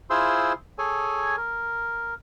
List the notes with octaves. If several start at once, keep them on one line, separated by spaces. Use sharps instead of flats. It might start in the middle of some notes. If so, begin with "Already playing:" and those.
E4 F4 G#4 C5 C6 E6
G#4 A4 C#5 G#5
A#4